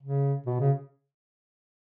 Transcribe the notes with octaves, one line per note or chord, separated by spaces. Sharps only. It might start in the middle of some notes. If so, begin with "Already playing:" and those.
C#3
B2
C#3